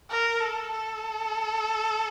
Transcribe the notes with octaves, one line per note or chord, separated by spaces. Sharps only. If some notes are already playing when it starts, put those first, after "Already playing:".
A#4
A4
A4